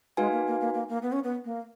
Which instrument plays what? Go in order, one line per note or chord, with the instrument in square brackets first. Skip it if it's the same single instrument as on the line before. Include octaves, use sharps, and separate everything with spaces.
[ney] G#3 [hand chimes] D#4 F#4 B4 F5 G#5
[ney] A#3
A#3
A#3
A#3
A#3
B3
C#4
B3
A#3